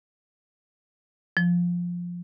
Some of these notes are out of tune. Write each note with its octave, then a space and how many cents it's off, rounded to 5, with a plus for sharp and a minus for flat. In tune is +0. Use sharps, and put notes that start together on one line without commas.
F3 +5